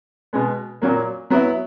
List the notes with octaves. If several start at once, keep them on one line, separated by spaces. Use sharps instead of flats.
B2 G#3 B3
A#2 F#3 A#3
F#3 B3 E4